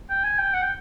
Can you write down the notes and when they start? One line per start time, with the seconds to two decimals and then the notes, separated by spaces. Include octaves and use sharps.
0.10 G5
0.24 G#5
0.38 G5
0.53 F#5
0.62 G5